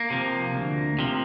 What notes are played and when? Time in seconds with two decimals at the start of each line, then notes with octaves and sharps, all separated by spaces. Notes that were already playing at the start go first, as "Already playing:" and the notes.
Already playing: A#3
0.10 C3 F3
0.54 D2
0.99 C3 F3